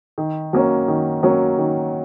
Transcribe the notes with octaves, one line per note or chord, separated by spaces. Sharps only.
D#3
F#3 A#3 C#4
D#3
F#3 A#3 C#4
D#3